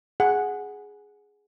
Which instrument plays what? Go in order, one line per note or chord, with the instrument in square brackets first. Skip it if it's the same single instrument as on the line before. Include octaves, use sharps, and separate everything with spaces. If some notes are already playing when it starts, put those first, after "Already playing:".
[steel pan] G#4 F#5